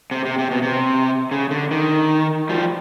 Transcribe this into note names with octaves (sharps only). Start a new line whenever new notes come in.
C3
C3
C3
B2
C3
C#3
D3
D#3
F3 G3